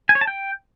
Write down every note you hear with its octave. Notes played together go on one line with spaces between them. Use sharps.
G#5
C#5
A5
G5